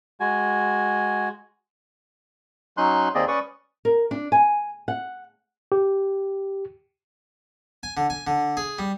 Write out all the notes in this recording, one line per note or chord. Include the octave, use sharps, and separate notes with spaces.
G#3 F#4 G#5
F#3 C#4 D#4 C6 F#6
D#2 A#3 C4 G#4 D5 D#5
C#4 B4 D5 C#6 D#6
A#4
D4
G#5
F#5
G4
G#5
D3
G#5
D3
G#4
G3